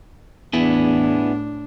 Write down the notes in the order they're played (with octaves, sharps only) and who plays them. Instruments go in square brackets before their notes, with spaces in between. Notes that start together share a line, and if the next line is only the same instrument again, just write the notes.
[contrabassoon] E2 [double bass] A2 D4 [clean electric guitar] B3 E4 G#4